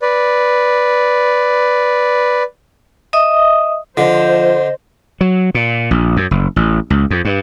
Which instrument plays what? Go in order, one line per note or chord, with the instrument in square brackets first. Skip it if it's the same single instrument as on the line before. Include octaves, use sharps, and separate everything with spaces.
[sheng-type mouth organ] B4 D5
[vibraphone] D#5 E5 D#6
[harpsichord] D3 [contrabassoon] F3 [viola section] C5 [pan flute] D#5
[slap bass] F#3
A#2
A#1
F#2
F#1
A1
C#2
F2
G2